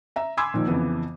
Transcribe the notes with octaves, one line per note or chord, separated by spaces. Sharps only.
E5 A#5
G#5 B5 C6 D6 E6 G#6
A#2 D#3 F3
F2 C#3 E3 B3